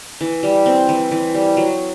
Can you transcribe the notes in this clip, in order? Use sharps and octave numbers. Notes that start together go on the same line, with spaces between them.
E3
G3
C4
E3
E3
G3
F#3